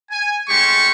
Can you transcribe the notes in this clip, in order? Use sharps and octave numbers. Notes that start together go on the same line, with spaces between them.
G#5
G#3 A3 C#4 G4 C6 C#6